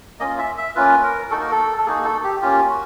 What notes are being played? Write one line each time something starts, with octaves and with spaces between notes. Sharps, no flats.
A#3 C#4 F4 D#5
E5
E5
A#3 C#4 F4 B4
A#4
A#3 D#4 F#4 A4
A#4
A4
A4
A#3 D#4 F#4 G#4
A4
G4
A#3 C#4 F4 G4
F#4